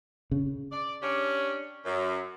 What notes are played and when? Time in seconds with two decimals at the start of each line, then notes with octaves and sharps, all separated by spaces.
0.31 C#3
0.72 D5
1.02 C#4 D4 G4
1.85 F#2